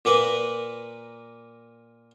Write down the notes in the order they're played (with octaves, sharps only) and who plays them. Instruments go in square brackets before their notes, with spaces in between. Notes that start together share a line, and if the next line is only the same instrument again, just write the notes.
[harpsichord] A#2 A#3 A#4 B4